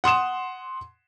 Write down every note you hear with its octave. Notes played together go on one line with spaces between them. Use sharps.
F#5 C6 D#6 E7